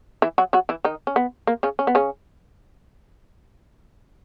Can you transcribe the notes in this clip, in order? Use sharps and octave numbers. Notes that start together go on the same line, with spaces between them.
E3 E4
F#3 F#4
F#3 F#4
E3 E4
D#3 D#4
C#4
B3
A#3
C#3 C#4
C#4
B3
C#3 C#4